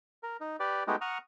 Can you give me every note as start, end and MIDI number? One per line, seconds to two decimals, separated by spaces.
0.23 0.37 70
0.40 0.56 63
0.60 0.83 67
0.60 0.83 71
0.60 0.83 74
0.87 0.96 56
0.87 0.96 57
0.87 0.96 59
0.87 0.96 63
0.87 0.96 66
0.87 0.96 67
1.01 1.18 78
1.01 1.18 82
1.01 1.18 85
1.01 1.18 87
1.01 1.18 89